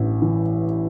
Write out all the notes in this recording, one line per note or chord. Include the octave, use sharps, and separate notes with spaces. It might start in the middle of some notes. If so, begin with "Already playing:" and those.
Already playing: A1 G2 E4
E3